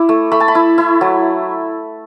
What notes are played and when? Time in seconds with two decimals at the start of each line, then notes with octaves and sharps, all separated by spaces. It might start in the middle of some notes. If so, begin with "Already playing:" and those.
Already playing: E4 D6
0.09 A3
0.32 A3 B5
0.40 A5
0.48 B5
0.55 E4
0.78 E4
1.01 F#3